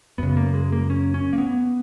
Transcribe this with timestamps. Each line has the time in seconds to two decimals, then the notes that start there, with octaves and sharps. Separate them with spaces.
0.18 F#2 C#3 B3
0.37 A#3
0.54 G#3
0.72 A#3
0.90 C#4
1.14 C#4
1.33 A#3
1.38 B3